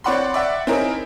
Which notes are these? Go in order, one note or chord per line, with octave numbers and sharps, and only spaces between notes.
C4 C#5 D5 F#5 B5 C6
D5 E5 F#5
C4 C#4 D#4 E4 G#4 A#4